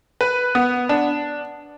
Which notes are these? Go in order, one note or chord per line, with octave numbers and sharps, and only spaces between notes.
B4
B3
D4